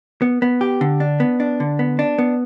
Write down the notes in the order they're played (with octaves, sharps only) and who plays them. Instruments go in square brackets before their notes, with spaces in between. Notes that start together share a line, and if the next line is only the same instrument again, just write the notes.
[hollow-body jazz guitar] B3
B3
G4
D3
D4
B3
D4
D3
B3
D4
B3